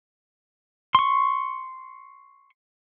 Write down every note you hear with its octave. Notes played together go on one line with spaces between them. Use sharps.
C6 C#6